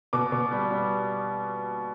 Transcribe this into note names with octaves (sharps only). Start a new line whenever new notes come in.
B2 D6
B2
G3
G3